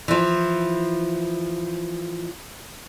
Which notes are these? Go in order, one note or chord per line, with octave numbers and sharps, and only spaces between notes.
E3 F3